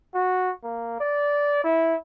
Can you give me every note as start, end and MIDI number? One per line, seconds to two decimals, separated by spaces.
0.14 0.52 66
0.64 0.98 58
1.01 1.63 74
1.64 1.95 64